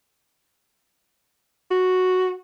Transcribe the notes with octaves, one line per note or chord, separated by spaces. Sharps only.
F#4